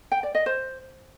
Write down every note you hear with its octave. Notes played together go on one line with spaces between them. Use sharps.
G5
D5
D#5
C5